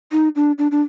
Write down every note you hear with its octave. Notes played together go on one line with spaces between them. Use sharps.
D#4
D4
D4
D4